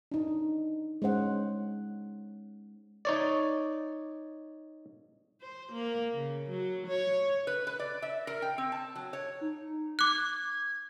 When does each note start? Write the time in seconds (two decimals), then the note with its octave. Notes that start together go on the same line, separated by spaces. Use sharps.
0.11 D4 D#4
1.02 G#3 C#4 C5 F#5
3.05 D#4 C#5 D5
5.41 C5
5.73 A#3
6.13 C#3
6.49 F#3
6.87 C#5
7.47 B4
7.67 B4
7.80 D5
8.02 E5
8.27 A#4
8.42 G5
8.58 C4
8.72 A5
8.95 F#3
9.13 C#5
9.41 D#4
9.99 D6 F#6 G#6